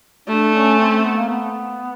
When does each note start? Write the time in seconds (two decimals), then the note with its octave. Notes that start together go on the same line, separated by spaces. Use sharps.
0.28 A3 D4
0.54 C#4
0.79 C4
1.03 B3
1.17 A#3
1.29 B3